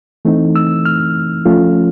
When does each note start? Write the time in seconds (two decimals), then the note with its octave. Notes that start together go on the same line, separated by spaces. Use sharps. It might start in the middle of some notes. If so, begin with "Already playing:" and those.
0.25 E3 A3 C4 D#4
0.56 E6
0.85 F6
1.45 F3 A3 C#4 F4